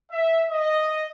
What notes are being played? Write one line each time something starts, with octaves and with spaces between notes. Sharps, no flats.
E5
D#5